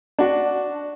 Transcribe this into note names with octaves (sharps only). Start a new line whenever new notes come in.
D4 F#4